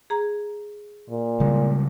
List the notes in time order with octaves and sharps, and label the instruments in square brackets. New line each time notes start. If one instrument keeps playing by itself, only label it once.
[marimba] G#4 A#5
[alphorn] A#2
[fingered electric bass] C#3 G3 G#3